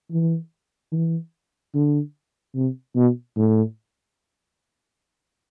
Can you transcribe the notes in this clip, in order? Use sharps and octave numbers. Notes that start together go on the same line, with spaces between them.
E3
E3
D3
C3
B2
A2